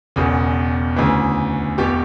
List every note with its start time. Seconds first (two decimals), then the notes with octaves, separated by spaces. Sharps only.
0.16 E1 E2 C#3
0.96 D2 C#3 E3
1.78 E1 E2 B2 G4